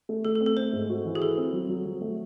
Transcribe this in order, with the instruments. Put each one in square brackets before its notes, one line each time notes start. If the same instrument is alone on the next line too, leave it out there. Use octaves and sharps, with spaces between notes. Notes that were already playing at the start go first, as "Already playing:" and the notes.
[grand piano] A3
[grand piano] A3 [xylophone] A4
[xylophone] A4
[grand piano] C4
[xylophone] A4
[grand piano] A3 [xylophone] C5
[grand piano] G#2
F#4
E3
[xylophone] G#4
[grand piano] F#4 [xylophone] A4
[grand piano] C4
F#3
F#3
F#3
A3